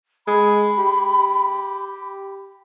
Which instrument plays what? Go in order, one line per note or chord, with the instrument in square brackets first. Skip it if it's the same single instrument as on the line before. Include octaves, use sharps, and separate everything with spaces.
[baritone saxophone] G#3 [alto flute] B5
[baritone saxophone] G4